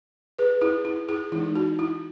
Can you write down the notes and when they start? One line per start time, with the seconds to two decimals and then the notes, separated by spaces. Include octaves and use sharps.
0.39 G#4 B4
0.61 E4 G#4
0.85 E4
1.09 E4 G#4
1.32 E3 E4
1.35 G#3 D#4
1.56 F#4
1.79 E4